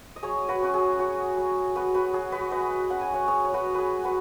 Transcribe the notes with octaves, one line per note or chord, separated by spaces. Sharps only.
D#5
F#3 G#4 C#5
F#4 B4
C#4 F#4
G#4
F#3 F#4
F#3 G#4
B3 F#4 B4
F#4 B4
F#3 G#4
F#4 B4
G#3 B4 D#5
C#4 F#5
G#5
C#5 F#5
F#3 G#4 C#5
C#5
F#4 B4
B3
G#4 B4
F#3 F#4 B4